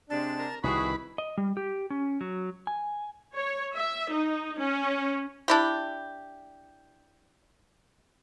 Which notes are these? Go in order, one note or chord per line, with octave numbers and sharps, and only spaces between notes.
C3 G#3 D4 A5
A#4
C2 C3 D#3 E4 F#4 G#4 B4 B5
D#5
G3
G4
C#4
F#3
G#5
C#5
E5
D#4
C#4
D4 E4 G4